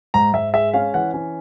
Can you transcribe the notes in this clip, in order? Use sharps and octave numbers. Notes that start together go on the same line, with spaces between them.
G#2 A#5
G#2 E5
G#3 E5
C#4 F5
E3 F#5
C#4